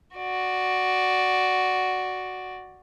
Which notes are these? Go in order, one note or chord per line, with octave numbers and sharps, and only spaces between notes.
F#4 D5